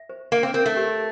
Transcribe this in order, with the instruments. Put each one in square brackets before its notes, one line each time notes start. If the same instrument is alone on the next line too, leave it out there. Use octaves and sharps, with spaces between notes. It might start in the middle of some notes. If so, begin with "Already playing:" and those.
Already playing: [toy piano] E5
C5
[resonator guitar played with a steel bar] A#3 [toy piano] E5
[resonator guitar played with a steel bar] C4
[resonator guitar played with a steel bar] C4 [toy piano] A#4
[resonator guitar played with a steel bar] A3
[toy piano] G4